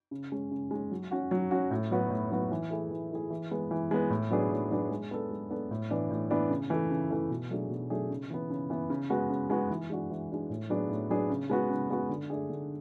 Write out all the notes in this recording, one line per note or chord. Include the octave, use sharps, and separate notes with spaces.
C#3
G#3 C#4
C#3
G#3 C#4
F#3
C#4 F#4
F#3
C#4 F#4
A2
F#3 B3 F#4
A2
F#3 B3 F#4
E3
A3 E4 G#4
E3
A3 E4 G#4
E3
G#3 B3
E3
G#3 B3
A2
F#3 B3 D4 G#4
A2
F#3 B3 D4 G#4
G#3
B3 D4 A4
G#3
B3 D4 A4
A2
E3 B3 D4
A2
E3 B3 D4
C#3
E3 A3
C#3
E3 A3
B2
F#3 A3 D4 G#4
B2
F#3 A3 D4 G#4
C#3
E3 B3
C#3
E3 B3
C#3
G#3 B3 F#4
C#3
G#3 B3 F#4
E3
G#3 D4 F#4
E3
G#3 D4 F#4
A2
F#3 B3 D4 G#4
A2
F#3 B3 D4 G#4
C#3
G#3 B3 F#4
C#3
G#3 B3 F#4
D3
A3 D4 G#4
D3